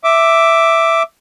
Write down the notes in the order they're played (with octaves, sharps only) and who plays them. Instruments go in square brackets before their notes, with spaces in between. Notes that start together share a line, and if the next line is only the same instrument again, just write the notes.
[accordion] E5 D6